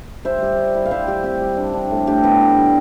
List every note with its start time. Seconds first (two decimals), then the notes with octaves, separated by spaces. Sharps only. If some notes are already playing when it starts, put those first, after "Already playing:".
0.25 G3 C5 E5
0.42 G3
0.57 G3
0.74 E4
0.86 F5
0.91 G3 C5 E5
1.07 G3 G4
1.24 C4 G4
1.41 G3
1.57 D4
1.73 D4
1.91 A2
2.07 D4 G4
2.23 B3 G4
2.41 D4
2.57 G3